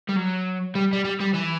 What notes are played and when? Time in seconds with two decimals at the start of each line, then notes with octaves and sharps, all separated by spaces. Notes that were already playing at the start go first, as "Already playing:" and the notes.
0.09 G3
0.16 F#3
0.75 G3
0.93 G3
1.05 G3
1.20 G3
1.34 E3